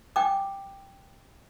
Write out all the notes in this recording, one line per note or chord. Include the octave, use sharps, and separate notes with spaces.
G5 D6